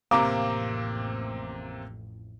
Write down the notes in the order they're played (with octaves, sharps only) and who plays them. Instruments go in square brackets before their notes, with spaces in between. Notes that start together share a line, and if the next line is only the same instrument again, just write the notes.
[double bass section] A1 F2 [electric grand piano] C3 A#3 C4 [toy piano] F5 A#5 [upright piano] D6